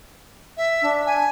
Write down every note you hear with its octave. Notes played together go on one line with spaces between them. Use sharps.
E5
D4
G#5